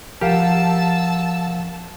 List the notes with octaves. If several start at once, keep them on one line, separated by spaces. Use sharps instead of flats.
F3 G4 A#4 F5 F#5 A5 E6